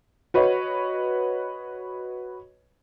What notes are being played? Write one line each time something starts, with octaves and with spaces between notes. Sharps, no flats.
F#4 B4 C#5 D#5